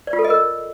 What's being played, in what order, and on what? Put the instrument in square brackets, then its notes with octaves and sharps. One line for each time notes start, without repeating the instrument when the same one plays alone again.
[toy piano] D5
F4
A4
D#5
A#4